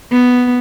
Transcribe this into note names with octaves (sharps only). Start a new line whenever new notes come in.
B3